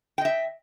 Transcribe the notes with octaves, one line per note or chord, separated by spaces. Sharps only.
D#5 E5 G5